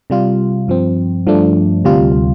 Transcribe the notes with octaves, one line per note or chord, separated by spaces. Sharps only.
C3 G3 F4
G2 F3 C4
G2 F3 A3 D4
D2 C3 G3 F4